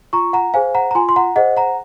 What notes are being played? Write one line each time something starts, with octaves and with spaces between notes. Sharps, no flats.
F4 A#5 C#6
F#5 A#5
G#4 C5 F5 G#5
F#5 A#5
A#5
F4 G#5 C6
C6
F#5 A#5
G#4 C5 D#5 F#5
F#5 A#5